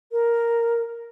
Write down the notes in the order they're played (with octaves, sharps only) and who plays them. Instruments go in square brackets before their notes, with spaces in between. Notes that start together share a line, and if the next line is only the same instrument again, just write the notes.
[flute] A#4